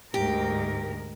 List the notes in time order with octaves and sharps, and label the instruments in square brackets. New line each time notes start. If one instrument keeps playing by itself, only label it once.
[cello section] D2 G#2 A#4 [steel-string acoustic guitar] G4